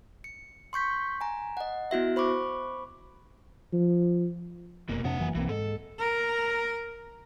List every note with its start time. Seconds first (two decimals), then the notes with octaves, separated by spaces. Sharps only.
0.24 C#7
0.73 C6 C#6 G6 B6
1.21 G#5 A#5
1.57 D#5 F#5
1.91 B3 E4 F#4 E5
2.16 C5 B5 C#6 D6
3.73 F3
4.89 F1 B2 A#3
5.04 F2 C3 A#3 D4 F#5
5.18 F1 F#2 E3
5.35 B1 E3 A#3 C4
5.49 G#2 G#3 A4
5.99 A#4